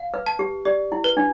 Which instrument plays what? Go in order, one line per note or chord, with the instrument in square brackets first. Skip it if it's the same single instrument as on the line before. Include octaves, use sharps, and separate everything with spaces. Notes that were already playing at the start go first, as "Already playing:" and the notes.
Already playing: [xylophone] F5
[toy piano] B4
[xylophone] A5
[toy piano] G4
[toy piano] G4 [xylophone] D5
[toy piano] E4
[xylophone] B4
[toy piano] D4